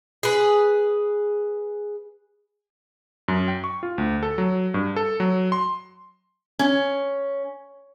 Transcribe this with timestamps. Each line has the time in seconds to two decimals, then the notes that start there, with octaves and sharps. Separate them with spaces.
0.23 G#4 B4
3.28 F#2
3.48 G5
3.64 C#6
3.83 F4
3.98 D2
4.23 A4
4.38 F#3
4.74 G2
4.96 A4
5.20 F#3
5.52 C6
6.59 C#4